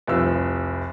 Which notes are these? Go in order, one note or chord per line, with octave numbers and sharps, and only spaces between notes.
F1 C2 F3 E6